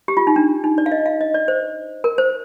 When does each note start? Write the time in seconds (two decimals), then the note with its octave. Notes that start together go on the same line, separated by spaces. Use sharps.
0.08 G4
0.17 F4
0.27 D#4
0.36 D4
0.64 D#4
0.78 D5
0.86 F5
0.92 D#5
1.06 F5
1.21 D#5
1.34 D5
1.48 C5
2.04 A#4
2.18 C5